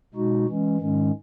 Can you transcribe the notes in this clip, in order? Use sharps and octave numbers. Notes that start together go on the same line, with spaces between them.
B2 G#3 D#4 F#4
E3 G#3 C#4
G#2 D#3 G#3 C#4